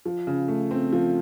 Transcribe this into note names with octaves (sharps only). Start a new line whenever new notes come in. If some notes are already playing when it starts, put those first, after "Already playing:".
F3
C#3
A3
C4
F3